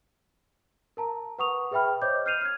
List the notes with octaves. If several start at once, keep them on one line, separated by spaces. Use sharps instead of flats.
A#4 A5 A#5
B4 F#5 C#6 D#6 F7
G#4 B4 E5 G5 B5 F6
C5 C#5 D#5 D6 G6
F6 G6 C7 D#7 F7
F6 G#6